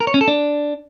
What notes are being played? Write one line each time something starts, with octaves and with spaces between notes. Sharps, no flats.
A#4
C#5
C#4
A4
D4